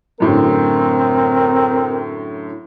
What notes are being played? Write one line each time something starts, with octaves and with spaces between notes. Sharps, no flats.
F#2 A2 D3 C4 A#4